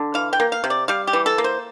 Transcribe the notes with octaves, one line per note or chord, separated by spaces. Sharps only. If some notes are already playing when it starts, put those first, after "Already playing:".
Already playing: D3
E3 F5
G5
A#3
F5
C3
D5
G3 F5
G4
E3
A4
A#3
C5